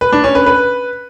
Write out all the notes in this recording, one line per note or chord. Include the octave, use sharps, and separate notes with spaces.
B4
D4
C#4
B4
B4